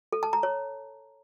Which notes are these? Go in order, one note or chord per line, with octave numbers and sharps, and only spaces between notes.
A4
A5
A#5
C#5